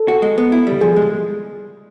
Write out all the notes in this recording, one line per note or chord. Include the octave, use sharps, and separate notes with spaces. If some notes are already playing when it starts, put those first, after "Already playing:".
Already playing: A4
F#4
G#3
B3
E4
G3
F3 G#4
G#3